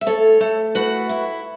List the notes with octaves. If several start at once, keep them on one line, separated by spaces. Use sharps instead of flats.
E5
A3 A4 C#5
A3
E4 F#4 B4
E4